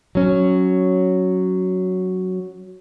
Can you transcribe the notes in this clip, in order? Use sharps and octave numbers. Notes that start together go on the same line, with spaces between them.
F#3 C#4